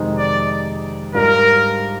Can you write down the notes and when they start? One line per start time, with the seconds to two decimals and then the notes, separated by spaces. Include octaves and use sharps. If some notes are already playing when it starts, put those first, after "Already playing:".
Already playing: F2 C3 D#3 G#3 D#4
0.18 D5
1.14 G#2 G3 D4 F4 A#4